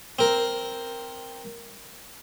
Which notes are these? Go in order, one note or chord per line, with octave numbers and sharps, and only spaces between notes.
C4 A#4